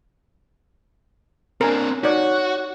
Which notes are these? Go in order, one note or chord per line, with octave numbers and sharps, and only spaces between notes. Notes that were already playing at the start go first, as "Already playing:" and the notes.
C4 D4 A#4 G#5
D#4 F#4 C#5 D5